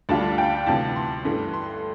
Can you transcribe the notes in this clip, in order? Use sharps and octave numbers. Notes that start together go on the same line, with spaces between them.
D2 D3 G3 D4 F4 A5
G5
D2 C3 E3 A5
C6
G2 E3 A3
C6